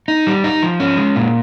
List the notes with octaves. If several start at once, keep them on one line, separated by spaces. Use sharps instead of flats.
D#4
G3
D#4
F3
C#4
G#3
A#2